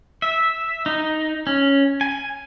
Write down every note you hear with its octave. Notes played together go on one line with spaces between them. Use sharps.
E5
D#4
C#4
G#5